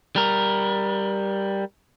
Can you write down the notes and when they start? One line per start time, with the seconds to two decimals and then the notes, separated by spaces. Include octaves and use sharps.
0.16 G3 A#4